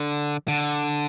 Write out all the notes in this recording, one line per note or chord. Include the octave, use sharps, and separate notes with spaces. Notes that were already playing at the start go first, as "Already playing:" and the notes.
Already playing: D3
D3